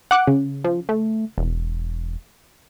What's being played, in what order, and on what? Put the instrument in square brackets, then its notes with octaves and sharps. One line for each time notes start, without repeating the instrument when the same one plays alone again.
[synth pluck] F#5 D6 F#6
C#3
[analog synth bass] F3
A3
E1